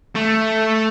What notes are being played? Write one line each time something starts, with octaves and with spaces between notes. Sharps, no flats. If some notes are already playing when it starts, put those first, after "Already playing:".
A3